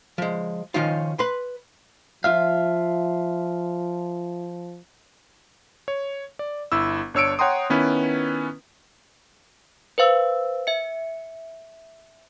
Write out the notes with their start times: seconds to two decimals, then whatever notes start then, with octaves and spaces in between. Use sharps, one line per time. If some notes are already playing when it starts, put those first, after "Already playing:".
0.18 F3 G#3
0.74 D#3 F3 C#4 D#4 F4
1.19 B4 C6
2.24 F3 F4 E5 F5
5.88 C#5
6.39 D5
6.72 G1 E4 E6
7.14 G1 D4 C#5 E6 C#7 D7
7.39 C#5 F#5 G5 A#5 C6 D#6
7.70 D#3 B3 C#4 E4 B4
9.98 B4 C5 F5 E6
10.67 E5 C#7